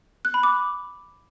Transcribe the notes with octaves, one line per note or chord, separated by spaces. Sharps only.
F#6
B5
D6